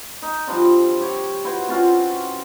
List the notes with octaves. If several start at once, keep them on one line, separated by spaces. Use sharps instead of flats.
D#4
F3 G3 C4 D4
G4 C#5
E4 F#4 B4 C5
C4 C#4 F4 F#4